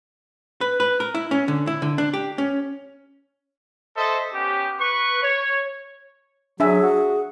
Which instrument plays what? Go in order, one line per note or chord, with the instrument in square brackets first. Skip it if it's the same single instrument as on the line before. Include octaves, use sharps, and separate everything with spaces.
[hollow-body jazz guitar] B4
B4
A#4
E4
C#4
D3
E4
D3
D4
G4
C#4
[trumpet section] A4 C5 D#5 E5
B3 C#4 G4
B4 C#6
C#5
[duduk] F#3 [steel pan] D4 E5 G#5 [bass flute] G#4
[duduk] F#4